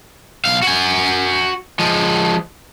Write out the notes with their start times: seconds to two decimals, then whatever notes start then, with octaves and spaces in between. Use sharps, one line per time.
0.45 B1 F5
0.63 F#4 G#5
1.79 F3 G#3